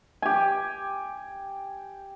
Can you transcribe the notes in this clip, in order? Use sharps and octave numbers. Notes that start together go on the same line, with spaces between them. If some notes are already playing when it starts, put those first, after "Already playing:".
G4 G#5